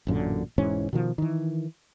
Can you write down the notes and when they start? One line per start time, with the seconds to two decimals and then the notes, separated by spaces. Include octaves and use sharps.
0.07 A1 F#2 A#2 D3
0.58 E1 G#2 E3 C#4
0.93 B2 D#3 F3
1.18 D#3 E3